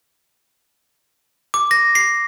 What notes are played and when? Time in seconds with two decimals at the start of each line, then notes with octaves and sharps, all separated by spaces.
1.54 D6
1.71 A#6
1.95 C7